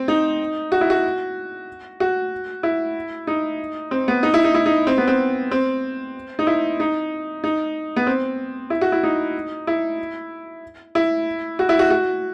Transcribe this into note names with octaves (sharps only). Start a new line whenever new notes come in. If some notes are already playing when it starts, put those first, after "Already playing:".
Already playing: C4
D#4
F#4
E4
F#4
F#4
E4
D#4
C4
B3
D#4
E4
D#4
E4
D#4
C4
B3
C4
C4
D#4
E4
D#4
D#4
B3
C4
E4
F#4
E4
D#4
E4
E4
F#4
E4
F#4
F#4